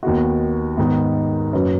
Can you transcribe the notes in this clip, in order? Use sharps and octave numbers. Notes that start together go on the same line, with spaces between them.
D#2 D#3 B3 F#4
G#2 D#3 B3 D#4
F#1 F#2 F#3 C#4 B4